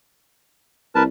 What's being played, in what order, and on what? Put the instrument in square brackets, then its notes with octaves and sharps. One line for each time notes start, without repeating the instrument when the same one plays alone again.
[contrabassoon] C2 [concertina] A#4 B4 A5